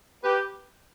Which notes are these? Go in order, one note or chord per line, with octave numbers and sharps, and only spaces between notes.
G4 B4